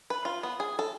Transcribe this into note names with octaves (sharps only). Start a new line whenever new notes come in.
B4
F4
B3
G#4
A4